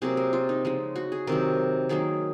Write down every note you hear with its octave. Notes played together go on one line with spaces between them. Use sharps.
C3 F#3 A#3 G#4
A#4
F4
D#4
C#3 F3 G#3
F#4
G#4
C3 D#3 F#3 A#4
D#3 F#3 A#3 G#4